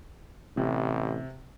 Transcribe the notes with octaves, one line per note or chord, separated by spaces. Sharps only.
A1 C3